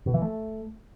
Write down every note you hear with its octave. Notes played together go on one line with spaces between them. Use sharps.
B2
E3
A3